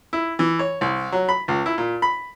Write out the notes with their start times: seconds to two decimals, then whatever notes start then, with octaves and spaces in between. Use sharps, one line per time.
0.13 E4
0.39 E3
0.59 C#5
0.81 C2
1.12 F#3
1.29 B5
1.48 C#2
1.66 E4
1.78 A#2
2.02 B5